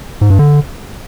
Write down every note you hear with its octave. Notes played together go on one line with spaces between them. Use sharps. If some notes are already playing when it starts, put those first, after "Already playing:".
G#2
G2
D3